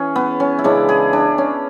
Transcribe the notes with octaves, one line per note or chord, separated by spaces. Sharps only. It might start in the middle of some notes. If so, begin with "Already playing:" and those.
Already playing: E3 C#4 G#4
B3
C#4
E4
C#3 E3 G#3 D4
G#4
D4
C#4